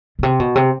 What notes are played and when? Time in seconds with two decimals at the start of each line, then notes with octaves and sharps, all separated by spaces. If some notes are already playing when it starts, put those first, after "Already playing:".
0.19 B2
0.23 C3
0.39 B2
0.55 C3